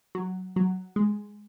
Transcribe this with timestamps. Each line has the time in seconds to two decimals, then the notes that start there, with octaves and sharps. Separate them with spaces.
0.15 F#3
0.56 F#3
0.96 G#3